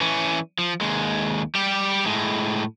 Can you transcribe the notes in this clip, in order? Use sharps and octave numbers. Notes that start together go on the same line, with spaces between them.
E3 C#4
F3
D#2 G#3
G3 G4
A2 G#3